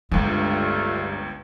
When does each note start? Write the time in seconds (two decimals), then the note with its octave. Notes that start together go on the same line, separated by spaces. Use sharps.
0.12 G1 C#2 G2 G#3 A3 B3 F4